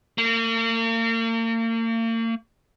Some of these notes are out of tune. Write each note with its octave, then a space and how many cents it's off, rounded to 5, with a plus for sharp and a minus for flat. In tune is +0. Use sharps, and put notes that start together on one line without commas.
A#3 -40